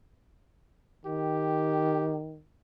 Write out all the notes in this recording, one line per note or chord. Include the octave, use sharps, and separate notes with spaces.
D#3 G4